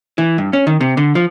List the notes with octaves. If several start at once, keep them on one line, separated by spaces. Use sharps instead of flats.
E3
G2
C#4
D#3
C3
D3
F3